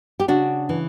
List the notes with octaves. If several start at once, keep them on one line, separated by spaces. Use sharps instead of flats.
G4
C#3 D4 F#4
E3